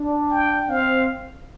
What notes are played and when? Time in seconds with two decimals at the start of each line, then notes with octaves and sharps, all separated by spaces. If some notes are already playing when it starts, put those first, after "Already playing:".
Already playing: D4
0.31 G5
0.69 C4 F5